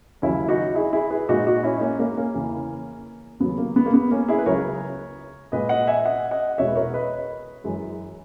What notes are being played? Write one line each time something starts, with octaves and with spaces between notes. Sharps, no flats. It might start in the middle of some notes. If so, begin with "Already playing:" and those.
D#2 C#3 F#3 C#4 E4
D#4 F#4
E4 G#4
E4 G#4
G#4 B4
A#2 G#3 D#4 F#4
D#4 F#4
C#4 E4
D#4
A#3 C#4
A#3 C#4
A#3 C#4
E2 C#3 E3
D#2 C#3 F#3 B3
A#3
B3
A#3
B3
A#3 C#4
E4 G#4
B4
C#2 C#3 F#3 A#4 C#5
A#2 G#3 B4 D#5
D#5 F#5
E5 G#5
D#5 F#5
D#5 F#5
E2 B2 G#3 C#5 E5
B4
A#4 C#5
B4 D#5
F#2 E3 G#3